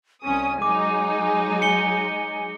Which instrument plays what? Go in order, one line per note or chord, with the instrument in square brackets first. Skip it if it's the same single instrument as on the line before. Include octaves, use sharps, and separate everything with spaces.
[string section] C2 C#4 D#6 [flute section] G#5
[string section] F#3 G#3 D#4 [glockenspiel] D6
[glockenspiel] C#7 G7